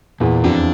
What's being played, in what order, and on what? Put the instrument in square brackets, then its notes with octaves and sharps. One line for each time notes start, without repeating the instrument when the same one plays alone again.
[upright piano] E2 E3 [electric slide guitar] A#2
[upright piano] F2 F3 [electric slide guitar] D4